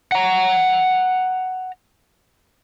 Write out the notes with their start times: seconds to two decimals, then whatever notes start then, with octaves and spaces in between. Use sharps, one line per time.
0.12 F#5 A#5